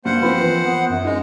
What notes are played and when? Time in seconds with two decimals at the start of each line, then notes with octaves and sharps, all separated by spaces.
0.05 G2 A#3 C5 F#5
0.22 F3 A#3 C4 B4
0.42 E3
0.65 B3
0.89 F#2
1.04 G#3 D#4